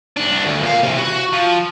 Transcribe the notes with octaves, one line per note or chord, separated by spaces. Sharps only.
C2 D4
D2
A#2 F5
C3 E3
F#4
F3